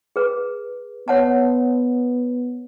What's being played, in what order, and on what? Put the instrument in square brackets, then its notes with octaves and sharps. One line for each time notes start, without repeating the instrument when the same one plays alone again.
[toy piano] G#4 B4
[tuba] B3 [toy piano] C#5 F#5 A5